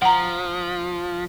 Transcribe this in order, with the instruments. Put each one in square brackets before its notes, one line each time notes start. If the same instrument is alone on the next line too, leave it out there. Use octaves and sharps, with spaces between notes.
[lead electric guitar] F3 [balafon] F#5 A#5